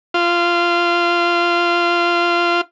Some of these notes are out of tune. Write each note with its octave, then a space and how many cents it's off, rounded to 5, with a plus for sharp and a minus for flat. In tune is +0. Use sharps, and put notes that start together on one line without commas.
F4 -15